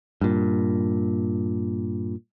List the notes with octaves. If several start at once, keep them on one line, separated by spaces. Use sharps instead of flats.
G2 A#2